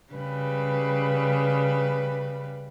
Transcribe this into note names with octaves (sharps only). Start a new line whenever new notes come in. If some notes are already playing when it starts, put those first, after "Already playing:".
C#3 G3 B4